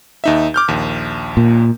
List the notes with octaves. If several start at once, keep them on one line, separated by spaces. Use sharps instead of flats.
D#2 D#4 E5
D6 F6 G6
A#1 D#2
A#2